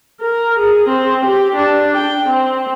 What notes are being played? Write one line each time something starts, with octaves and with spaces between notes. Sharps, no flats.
A#4
G#4
C4
G4
D4
G5
C4